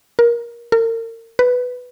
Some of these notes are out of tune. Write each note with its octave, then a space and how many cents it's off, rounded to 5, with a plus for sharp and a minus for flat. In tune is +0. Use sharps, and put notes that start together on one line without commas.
A#4 +20
A#4 -40
B4 +5